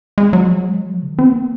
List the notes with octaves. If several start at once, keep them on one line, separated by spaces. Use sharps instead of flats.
G#3
F#3
F3
F#3
G#3
F#3
F3
C#3
D#3
C4
A#3